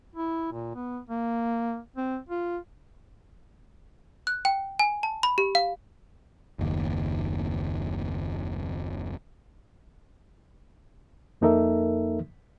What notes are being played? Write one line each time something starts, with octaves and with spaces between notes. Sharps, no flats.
E4
A#2
B3
A#3
C4
F4
F#6
G5
G#5
A5
B5
G4
F5
F#1 D#2
F2 A#3 D#4 A4 A#4 E5